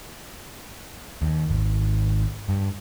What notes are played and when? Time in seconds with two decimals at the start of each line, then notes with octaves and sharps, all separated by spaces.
1.22 D#2
1.51 G#1
2.49 G2